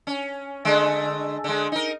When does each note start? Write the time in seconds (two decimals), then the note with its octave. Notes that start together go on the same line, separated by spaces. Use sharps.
0.07 C#4
0.65 D3 G#3 A3
1.44 D3 G#3
1.72 D#4 A#4